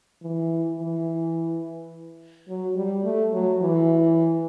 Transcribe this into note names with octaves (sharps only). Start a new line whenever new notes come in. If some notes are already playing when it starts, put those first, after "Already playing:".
E3
E3
F#3
G3
A3
F#3
E3